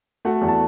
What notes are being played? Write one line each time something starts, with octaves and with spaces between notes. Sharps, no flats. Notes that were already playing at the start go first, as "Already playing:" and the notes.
A3 F#4 F#5
E2
A5